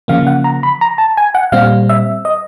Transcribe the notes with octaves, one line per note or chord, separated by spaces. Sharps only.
C#3 F3 A#3 F5
F#5
A#5
B5
A#5
A5
G#5
F#5
A#2 G3 C4 F5
E5
D#5